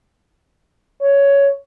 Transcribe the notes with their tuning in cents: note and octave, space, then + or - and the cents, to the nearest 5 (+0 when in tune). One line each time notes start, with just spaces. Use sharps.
C#5 +10